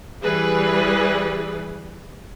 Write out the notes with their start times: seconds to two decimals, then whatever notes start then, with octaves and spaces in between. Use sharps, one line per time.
0.22 E3 G3 G#4 B4